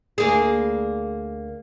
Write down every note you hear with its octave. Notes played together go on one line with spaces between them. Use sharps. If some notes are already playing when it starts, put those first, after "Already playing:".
D2 A#3 G#4